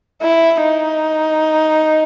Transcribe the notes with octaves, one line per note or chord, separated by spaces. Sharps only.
E4
D#4